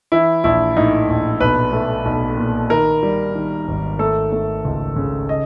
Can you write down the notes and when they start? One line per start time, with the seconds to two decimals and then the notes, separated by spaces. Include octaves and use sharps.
0.12 E3 E4
0.44 A#1 E4
0.77 A2 D#4
1.09 A#1
1.40 B1 B4
1.73 A3
2.05 B1
2.37 A#2
2.70 D#3 A#4
3.03 G3
3.35 D#3
3.68 G#1
3.99 A3 A4
4.32 A3
4.65 C#2
4.96 C#3
5.29 D#5